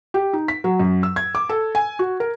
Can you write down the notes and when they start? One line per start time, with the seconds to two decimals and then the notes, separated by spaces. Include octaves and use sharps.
0.14 G4
0.33 D#4
0.48 B6
0.64 F#3
0.80 F#2
1.03 E6
1.16 G#6
1.35 D6
1.49 A4
1.75 G#5
1.99 F#4
2.20 A#4